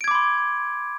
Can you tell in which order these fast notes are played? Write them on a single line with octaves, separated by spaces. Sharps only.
D7 G#6 D6 B5 C6